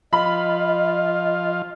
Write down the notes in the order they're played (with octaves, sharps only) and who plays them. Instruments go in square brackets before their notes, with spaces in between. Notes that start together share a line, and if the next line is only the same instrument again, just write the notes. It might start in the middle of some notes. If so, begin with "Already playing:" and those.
[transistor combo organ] F3 F4 [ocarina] D#5 [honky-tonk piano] B5